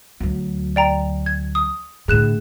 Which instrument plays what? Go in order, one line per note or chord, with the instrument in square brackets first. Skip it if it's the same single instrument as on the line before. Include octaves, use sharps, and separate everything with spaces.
[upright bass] D2 F#3
[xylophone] D5 G5 A#5
G#6
D#6
[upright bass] A2 D3 [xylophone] G#4 F#6 E7